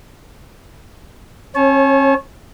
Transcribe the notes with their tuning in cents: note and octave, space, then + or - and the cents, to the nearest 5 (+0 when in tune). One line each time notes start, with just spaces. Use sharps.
C#4 -40 C#5 -20 A5 -45